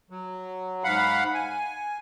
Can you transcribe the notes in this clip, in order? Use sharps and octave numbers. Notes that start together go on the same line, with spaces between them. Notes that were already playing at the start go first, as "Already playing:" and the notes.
F#3
G#2 F5 F#5 B5
G#5